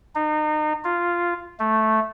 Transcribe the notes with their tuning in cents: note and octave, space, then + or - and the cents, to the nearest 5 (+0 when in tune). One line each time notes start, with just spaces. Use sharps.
D#4 -30
F4 -5
A3 -5